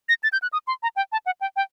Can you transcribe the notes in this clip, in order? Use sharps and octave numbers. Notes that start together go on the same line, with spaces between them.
A#6
A6
G6
F#6
D#6
C6
A#5
G5
A5
F#5
G5
G5